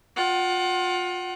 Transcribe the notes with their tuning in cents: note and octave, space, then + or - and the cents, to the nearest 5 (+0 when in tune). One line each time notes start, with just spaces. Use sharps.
F4 +30 F#5 +30